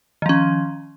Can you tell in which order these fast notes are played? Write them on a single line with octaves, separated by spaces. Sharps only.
D#3 F3 C#4